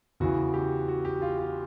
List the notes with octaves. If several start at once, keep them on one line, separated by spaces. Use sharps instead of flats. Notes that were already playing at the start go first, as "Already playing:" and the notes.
E2 C#3 E3 F#4
G4
F#4
G4
F4
F4